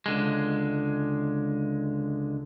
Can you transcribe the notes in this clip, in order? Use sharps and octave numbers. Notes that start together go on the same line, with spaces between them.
C#2 D3 G#3